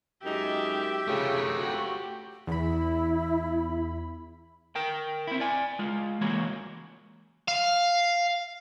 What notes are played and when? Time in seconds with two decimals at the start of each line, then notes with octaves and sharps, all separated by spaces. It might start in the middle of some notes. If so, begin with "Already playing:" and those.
0.24 F#2 G#3 D#4 G4 E5
1.08 C#3 A3 F4
1.58 F#4 G4
2.47 E2 E4 B5
4.75 A#4 G5
5.27 C4 E4
5.40 D5 G#5
5.79 G#3 F4
6.21 E3 G#3 A#3 F#4 C#5
7.48 F5